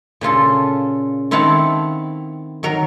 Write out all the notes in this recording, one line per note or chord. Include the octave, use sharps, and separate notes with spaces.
A#2 C#3 F4 A4
D#3 C4 E4 F5 F#5 A5
D#3 F#3 A#4